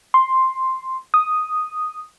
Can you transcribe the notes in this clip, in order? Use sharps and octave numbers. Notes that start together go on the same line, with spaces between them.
C6
D#6